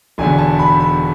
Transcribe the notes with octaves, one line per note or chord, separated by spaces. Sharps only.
E1 E2 D3 G#5
A5
B5
B5